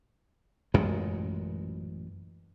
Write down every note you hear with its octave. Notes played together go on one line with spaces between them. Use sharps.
A1 F#2 A#2 G#3